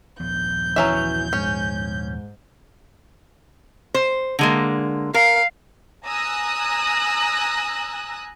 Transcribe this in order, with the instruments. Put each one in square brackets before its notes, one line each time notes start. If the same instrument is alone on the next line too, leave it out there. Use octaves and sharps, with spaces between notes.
[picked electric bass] D#1 F3 B3 [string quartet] G6
[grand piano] E3 [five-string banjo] F#3 C#4 E5
[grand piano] G#2 [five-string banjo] C#4
[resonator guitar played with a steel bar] C5
D3 G#3 A#3
[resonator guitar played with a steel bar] A#4 [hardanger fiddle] F5
[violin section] G#5 A#5 D#6 E6 F#6 A#6